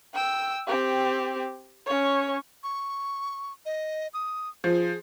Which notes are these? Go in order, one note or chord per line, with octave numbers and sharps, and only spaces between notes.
G5 E6
C4 G4
C#4 C#5
C#6
D#5
D#6
F3 G#4